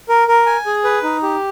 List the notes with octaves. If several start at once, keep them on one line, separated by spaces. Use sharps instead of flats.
A#4
A#4
G#5
G#4
B4
D#4
G4